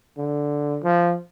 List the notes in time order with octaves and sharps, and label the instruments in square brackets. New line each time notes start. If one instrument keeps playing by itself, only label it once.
[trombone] D3
F3